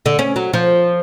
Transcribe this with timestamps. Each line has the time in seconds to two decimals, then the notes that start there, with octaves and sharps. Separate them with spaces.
0.06 D3
0.19 C#4
0.36 F#3
0.53 F3